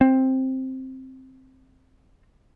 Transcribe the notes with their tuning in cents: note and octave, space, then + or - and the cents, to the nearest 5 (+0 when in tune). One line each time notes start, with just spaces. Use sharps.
C4 +5